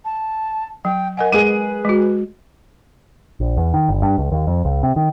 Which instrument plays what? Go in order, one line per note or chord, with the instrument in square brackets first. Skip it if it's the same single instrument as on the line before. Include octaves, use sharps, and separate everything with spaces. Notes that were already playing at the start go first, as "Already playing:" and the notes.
[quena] A5
[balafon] F#3 [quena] G5
[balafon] A#4 D#5 F#5 [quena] G#5
[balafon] G#3 [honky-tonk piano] G#4 D#7 [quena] B4
[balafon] G#3 F#4
[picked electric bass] A#1
E2
D#3
G1
G2
C#2
D#2
F2
C#2
C3
D#3